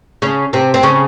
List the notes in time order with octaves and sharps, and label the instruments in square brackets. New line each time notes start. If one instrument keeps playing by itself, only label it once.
[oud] C#3 C#4
C3 C4
C4
C#3 C#4